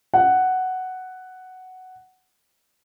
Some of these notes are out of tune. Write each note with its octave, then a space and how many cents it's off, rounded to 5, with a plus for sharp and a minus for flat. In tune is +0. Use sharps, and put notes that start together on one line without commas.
F#5 +5